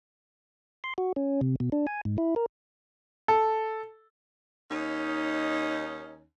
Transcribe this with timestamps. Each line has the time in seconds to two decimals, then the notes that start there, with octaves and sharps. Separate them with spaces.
0.84 C6
0.98 F#4
1.16 C#4
1.41 C3
1.60 B2
1.72 D4
1.87 G#5
2.05 G#2
2.18 E4
2.36 A#4
3.28 A4
4.71 D#2 C#4 D#4